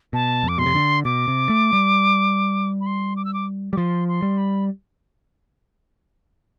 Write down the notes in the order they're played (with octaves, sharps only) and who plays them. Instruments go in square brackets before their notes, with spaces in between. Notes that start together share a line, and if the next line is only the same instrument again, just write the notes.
[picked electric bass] B2 [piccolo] A5
[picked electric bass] F2
[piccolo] D6
[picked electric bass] B2 [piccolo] C6
[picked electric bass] C3
D3
[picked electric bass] B2 [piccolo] D6
[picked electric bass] C3
A3
G3
[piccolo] B5
C6
D6
E6
D6
[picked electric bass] G3 [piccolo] D6
[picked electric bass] F3 [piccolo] C6
[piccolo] C6
[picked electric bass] G3
[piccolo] B5